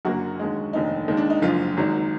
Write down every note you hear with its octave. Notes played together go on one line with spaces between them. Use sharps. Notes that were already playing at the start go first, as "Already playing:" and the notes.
F#1 F#2 D3 F#3 A#3 F#4
D#2 D3 G#3
F1 D#2 D3 D#4
D#2 D#3 G#3
D4
D#4
F#1 F#2 D3 F3 F4
G#1 G#2 D#3 F#3